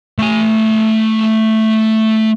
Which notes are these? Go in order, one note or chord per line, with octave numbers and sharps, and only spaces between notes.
A3 G#5